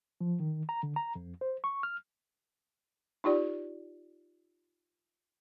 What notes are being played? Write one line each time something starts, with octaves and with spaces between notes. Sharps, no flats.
F3
D#3
A#5
D3
A#5
F2
C5
C#6
F6
D#4 F4 G4 D5